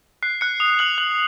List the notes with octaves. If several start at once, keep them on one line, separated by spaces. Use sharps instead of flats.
F#6 C7
F#6 C#7
D#6 F7
F#6 F#7
F#6 F#7